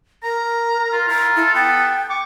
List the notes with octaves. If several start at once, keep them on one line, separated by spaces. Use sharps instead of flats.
A#4 A#5
F4
E4 F4 A#5
E4 A4
B3 G5
C#6 D6